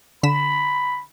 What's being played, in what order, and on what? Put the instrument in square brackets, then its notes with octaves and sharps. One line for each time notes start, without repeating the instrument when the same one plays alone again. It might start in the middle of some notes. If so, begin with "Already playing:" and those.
[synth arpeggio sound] D3 B6 E7 [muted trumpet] B5